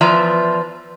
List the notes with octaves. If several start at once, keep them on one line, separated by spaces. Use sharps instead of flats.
E2 F3 B4 D5 E5 A#5